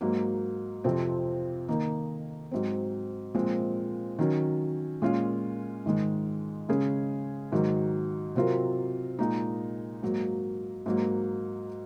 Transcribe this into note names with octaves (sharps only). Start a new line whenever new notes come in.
G#2 F#3 A#3
F2 C3 F3 C4
D#3 A#3 D#4
G#2 F#3 C4
A#2 F3 G#3 C4
D#3 F#3 C#4
A#2 G#3 C#4 F4
G#2 D#3 G#3
C#3 G#3 C#4 G#4
G#2 D#3 F#3
C3 F#3 C4 F4 A#4
A#2 G#3 D#4
G#2 F#3 A#3
G#2 F#3 A#3